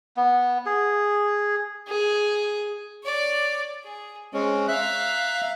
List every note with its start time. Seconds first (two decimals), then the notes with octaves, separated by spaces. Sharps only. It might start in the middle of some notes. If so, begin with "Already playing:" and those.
0.17 B3
0.66 G#4
1.88 G#4
3.03 C#5 D5
3.84 G#4
4.34 G#3 C4 C#4
4.68 E5 F5 A#5 F#6